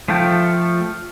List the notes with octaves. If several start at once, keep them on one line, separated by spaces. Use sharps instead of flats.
F3 A3 F4 A4 G5